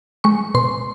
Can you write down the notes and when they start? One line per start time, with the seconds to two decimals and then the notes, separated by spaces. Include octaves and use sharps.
0.24 G#3 C#6
0.54 B2 C6